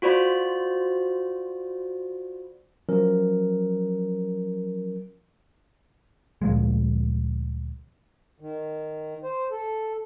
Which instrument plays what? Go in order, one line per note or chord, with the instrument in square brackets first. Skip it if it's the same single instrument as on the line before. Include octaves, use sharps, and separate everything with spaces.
[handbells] F4 F#4 C5 D5 B5
[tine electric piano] F3 F#3 C#4 A#4
[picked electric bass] D2 A#2 F3 G#3
[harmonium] D#3
C5
A4